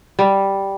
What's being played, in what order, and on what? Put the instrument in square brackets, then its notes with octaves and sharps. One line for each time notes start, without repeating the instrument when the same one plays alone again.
[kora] G3